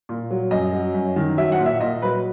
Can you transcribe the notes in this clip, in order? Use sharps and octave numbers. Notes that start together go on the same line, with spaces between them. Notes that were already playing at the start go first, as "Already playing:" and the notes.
A#2
F#3
F#2 D#5
F#3
F#2
D#3
F#3 E5
F#5
A#2
E5
A#2 D#5
F#3 B4